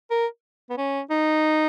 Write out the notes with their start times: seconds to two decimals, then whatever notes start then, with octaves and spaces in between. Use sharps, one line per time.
0.11 A#4
0.70 B3
0.77 C#4
1.10 D#4